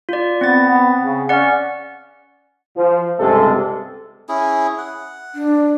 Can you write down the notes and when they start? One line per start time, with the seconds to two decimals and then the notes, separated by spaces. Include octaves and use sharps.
0.09 F4 D5
0.41 B3 C4 A6
0.69 B3
1.02 C#3
1.29 C#4 D5 F#5
2.77 F3
3.19 C#2 G2 C3 G#3 A4
4.29 C#4 E4 G#4
4.78 F#5
5.35 D4